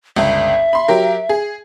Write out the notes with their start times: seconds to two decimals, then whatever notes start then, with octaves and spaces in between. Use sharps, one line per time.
0.16 G1 C#2 E5
0.73 B5 C6
0.88 F#3 G4 A#4
1.29 G#4